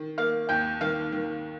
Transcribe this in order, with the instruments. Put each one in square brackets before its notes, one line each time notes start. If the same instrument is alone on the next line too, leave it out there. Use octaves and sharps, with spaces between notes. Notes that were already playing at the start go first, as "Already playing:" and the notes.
Already playing: [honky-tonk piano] D#3
[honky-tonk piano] A#3 [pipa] F5
[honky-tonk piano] D#2 [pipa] G5
[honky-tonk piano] D#3 [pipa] F5
[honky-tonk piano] D#3